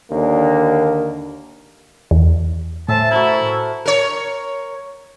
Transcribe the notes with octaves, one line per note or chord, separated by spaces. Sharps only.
D#2 D3 A#3 D4
E2
A2 C5 E5 G#5 A5
E4 F#4 A4 A#4
A#4 C#5